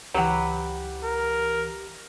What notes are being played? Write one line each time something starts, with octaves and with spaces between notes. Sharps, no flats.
C#2 E3 F#3 G4 B4 F#5
A#4